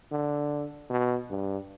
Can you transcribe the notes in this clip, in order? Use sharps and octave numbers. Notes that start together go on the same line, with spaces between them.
D3
B2
G2